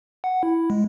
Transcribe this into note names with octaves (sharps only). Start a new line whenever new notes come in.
F#5
E4
G#3